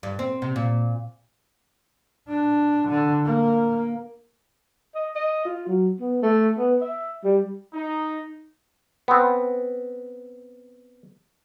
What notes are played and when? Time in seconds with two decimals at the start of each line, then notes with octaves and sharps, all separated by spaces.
0.03 G2
0.19 C4
0.42 C3
0.56 A#2
2.28 D4
2.89 D3
3.25 A#3
4.95 D#5
5.15 D#5
5.45 F4
5.67 F#3
6.00 B3
6.22 A3
6.58 B3
6.81 E5
7.24 G3
7.74 D#4
9.08 B3 C4